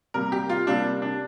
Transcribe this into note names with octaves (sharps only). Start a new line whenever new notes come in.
C3 G3 A#3 A#4
G4
F4
C3 G3 A#3 D4
D4